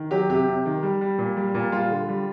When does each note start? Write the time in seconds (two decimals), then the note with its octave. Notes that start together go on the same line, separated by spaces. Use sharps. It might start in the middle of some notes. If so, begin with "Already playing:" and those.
Already playing: D#3
0.11 F#3 G4
0.30 C3 G4
0.47 C3
0.65 D#3
0.83 G3
1.01 G3
1.18 A#2
1.37 G3
1.54 A#2
1.72 G3 F4
1.90 D3
2.08 G3